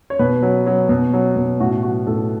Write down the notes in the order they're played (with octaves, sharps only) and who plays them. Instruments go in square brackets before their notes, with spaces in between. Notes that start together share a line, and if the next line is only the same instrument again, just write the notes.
[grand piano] C#5
B2 B4
F#3
F#3
B2
F#3
B2
A2 F#4
F#3 F#4
A2 A4